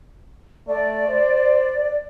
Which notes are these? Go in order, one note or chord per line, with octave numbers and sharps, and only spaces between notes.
A3 D5
C5